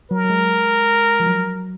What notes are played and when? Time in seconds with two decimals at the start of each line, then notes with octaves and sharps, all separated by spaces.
0.11 F#3 A#4
0.24 F#3
0.30 G#3
1.20 F3
1.26 F#3